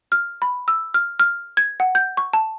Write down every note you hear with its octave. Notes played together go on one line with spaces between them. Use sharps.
F6
B5
E6
F6
F6
G#6
F#5
G6
C#6
A5